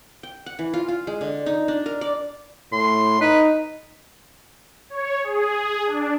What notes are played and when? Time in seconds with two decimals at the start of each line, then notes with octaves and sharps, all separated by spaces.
0.23 G5
0.46 F#5
0.59 E3
0.74 F4
0.88 F4
1.07 G#3
1.21 D3
1.46 D#4
1.68 D4
1.86 A#4
2.01 D5
2.73 A2 C6
3.21 D#4 B4
4.90 C#5
5.24 G#4
5.87 D4